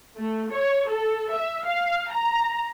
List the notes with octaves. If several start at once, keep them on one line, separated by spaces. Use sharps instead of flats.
A3
C#5
A4
E5
F5
A#5